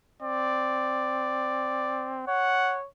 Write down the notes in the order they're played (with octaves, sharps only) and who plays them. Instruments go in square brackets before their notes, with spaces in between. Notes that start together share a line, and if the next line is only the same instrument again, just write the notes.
[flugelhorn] C4 [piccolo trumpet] D5
[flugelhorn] C#5 [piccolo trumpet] F#5